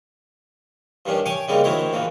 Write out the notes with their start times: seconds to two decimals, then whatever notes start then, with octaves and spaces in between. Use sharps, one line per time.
1.06 G2 D#3 C#4 D4
1.26 C#5 G5 G#5 C#6 D6
1.48 C#3 G3 G#3 A#3 B3 D#4
1.64 D2 D#3 E3 E4 C5 C#5
1.93 A#1 G#2 E3 A#3